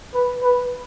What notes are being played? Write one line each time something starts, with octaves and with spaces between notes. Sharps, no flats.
B4
B4